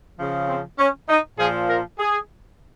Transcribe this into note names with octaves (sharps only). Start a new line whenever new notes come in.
C#3 F3
C4
C#4
D#4
A#2 F3 G#4
A#4
G#4